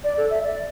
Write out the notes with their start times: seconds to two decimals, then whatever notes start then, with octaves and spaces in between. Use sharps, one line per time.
0.04 D5
0.17 A4
0.30 E5
0.43 D5